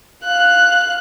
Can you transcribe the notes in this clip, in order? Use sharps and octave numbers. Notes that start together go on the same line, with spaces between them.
F5 F#6